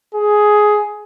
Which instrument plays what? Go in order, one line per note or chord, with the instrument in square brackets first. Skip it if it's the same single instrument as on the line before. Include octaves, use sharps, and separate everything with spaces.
[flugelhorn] G#4